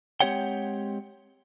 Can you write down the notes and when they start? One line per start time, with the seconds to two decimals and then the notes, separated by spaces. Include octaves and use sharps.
0.21 G#3 C4 G4 C#5 F#5 G5